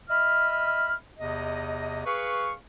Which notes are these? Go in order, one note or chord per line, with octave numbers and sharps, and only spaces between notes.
D#5 E5 B5 F6
E2 C3 D#5
G#4 B4 F5 C#6